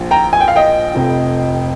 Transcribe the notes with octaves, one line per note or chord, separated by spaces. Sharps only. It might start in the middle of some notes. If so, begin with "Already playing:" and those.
Already playing: A#1 A#2 F3
G5 A#5
G#5
G5
F5
D#5 G5
F1 F2 C3 F3